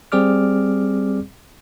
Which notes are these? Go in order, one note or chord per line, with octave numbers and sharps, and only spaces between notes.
G3 C4 G#4 D5 D6 F6